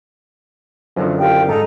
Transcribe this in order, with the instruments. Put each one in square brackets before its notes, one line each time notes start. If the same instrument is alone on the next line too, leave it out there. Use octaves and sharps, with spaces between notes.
[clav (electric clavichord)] F#2 D3 D#3 [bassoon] F3
[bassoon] C2 [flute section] F4 G4 G5
[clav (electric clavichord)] G#2 [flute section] D#4 A#5 [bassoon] A4